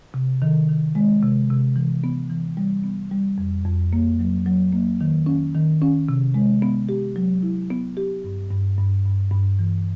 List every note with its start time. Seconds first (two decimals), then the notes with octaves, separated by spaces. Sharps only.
0.14 C3
0.42 D#3
0.69 D#3
0.95 G#3
1.22 C3
1.50 C3
1.76 E3
2.04 B3
2.30 E3
2.57 G3
2.84 B3
3.11 G3
3.38 F2
3.66 F2
3.93 A#3
4.20 F#3
4.46 F#3
4.73 A#3
5.01 D#3
5.26 C#4
5.55 D#3
5.82 C#4
6.09 C3
6.34 G#3
6.62 B3
6.89 G4
7.16 F#3
7.43 E4
7.70 B3
7.97 G4
8.24 G2
8.51 G2
8.78 G2
9.05 G2
9.31 G2
9.59 E3